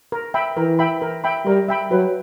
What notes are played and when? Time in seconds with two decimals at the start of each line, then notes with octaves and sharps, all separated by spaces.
0.12 A#4
0.34 E5 G5 B5
0.57 E3 A#4
0.79 E5 G5 B5
1.02 A#4
1.24 E5 G5 B5
1.46 G3 A#4
1.68 E5 G5 B5
1.91 F#3 B4